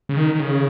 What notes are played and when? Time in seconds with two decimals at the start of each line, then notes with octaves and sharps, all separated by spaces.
0.09 C#3
0.17 D#3
0.35 D#3
0.40 C#3